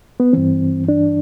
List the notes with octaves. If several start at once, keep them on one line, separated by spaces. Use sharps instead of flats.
B3
G2 E3 C4
D4